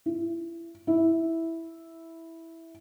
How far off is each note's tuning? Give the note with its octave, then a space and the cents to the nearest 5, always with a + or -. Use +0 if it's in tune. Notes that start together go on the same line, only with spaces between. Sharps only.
E4 +25
E4 -5